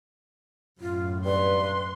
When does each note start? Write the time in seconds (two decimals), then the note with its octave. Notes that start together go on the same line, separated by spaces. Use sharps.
0.81 F#2 A2 F4
1.25 G2 B4 C6